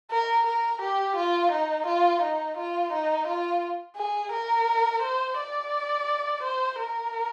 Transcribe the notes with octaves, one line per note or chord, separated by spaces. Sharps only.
A#4
A#4
G4
F4
D#4
F4
D#4
F4
D#4
F4
G#4
A#4
C5
D5
C5
A#4